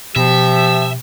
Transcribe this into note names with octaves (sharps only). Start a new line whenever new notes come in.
B2 F3 G4 E5